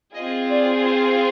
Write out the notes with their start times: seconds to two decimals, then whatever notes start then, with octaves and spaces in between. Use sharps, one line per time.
0.14 C4 F4 G#4 D#5
0.50 D5
0.85 C5